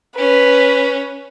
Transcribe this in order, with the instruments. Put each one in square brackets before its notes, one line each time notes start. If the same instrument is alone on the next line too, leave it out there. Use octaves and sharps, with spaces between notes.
[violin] C#4 [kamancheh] B4